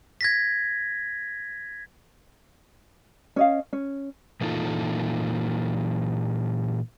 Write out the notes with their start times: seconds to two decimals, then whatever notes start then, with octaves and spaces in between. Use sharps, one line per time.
0.21 G#6 A#6 B6
3.36 C#4 D#5 F5
3.73 C#4
4.41 A#2 E3 A#3 D#4 F4 A4